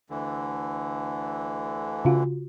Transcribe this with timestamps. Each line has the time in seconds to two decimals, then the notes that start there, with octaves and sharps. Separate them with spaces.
0.10 D2 D3 E3
2.05 C#3 F4 F#4